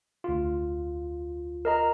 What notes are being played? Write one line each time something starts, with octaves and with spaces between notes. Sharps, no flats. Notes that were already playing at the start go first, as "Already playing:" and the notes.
D2 F4
A#4 D#5 A#5